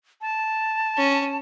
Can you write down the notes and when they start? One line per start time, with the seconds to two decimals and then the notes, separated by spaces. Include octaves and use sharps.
0.21 A5
0.97 C#4